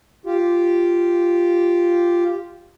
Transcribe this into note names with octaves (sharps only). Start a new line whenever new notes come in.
F4 G4